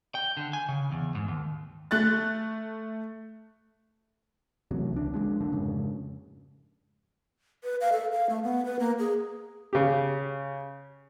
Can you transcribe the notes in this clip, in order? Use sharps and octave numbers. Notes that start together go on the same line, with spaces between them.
G5
D3
G#5
C#3
E2
G#2
D#2
A3 F#6 A6
A1 C3 F#3
C#2 D4
F3 F#3 G#3 D4
D1 A#1 D3 D4
F2 G#2 C#3
B4
F5
A4
F5
A3
B3
B4
A#3
G#4
C#3 G4